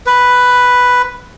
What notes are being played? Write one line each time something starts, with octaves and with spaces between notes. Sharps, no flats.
B4